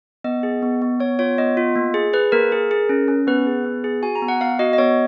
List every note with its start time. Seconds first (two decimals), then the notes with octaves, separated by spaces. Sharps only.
0.24 B3 D#5
0.43 G#4
0.63 B3
0.82 B3
1.00 B3 C#5
1.19 F4 C#5
1.38 B3 D#5
1.57 F4
1.76 A#3
1.94 G#4
2.13 G#4 B4
2.32 A#3 A#4
2.52 G#4
2.71 G#4
2.89 C#4
3.08 C#4
3.27 B3 B4
3.47 G#4
3.65 B3
3.84 G#4
4.02 F#4 G#5
4.15 A#5
4.22 B3
4.28 F#5
4.41 B3 F5
4.59 F#4 D#5
4.73 D#5
4.78 B3 C#5